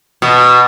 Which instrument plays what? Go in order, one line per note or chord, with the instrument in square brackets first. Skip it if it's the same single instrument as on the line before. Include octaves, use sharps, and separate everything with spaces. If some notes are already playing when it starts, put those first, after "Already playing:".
[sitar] B2